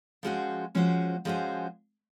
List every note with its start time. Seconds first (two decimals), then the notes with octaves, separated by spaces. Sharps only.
0.23 F3 G#3 C#4 F#4 C5
0.75 F3 G#3 C#4 F#4 C5
1.25 F3 G#3 C#4 F#4 C5